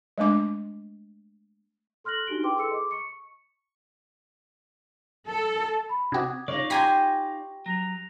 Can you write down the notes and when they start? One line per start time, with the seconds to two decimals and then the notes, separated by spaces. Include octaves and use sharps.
0.18 G#3 A3 D4 D6
2.04 A4 C6 F6 F#6 A#6 F#7
2.26 D4 D#4 F#4 G4 D7 G7
2.43 E4 G#4 B4 G5 C6 D6
2.57 G#4 A4 C6 E6 C#7
2.71 D#5 D6
2.91 C#6 C#7
5.29 A4
5.89 B5
6.12 C3 F#4 D6 D#6 G#6
6.48 C#3 D#4 F4 D5 C#6
6.70 G4 G#5 A#5 C6 B6
7.66 F#3 A#6 F7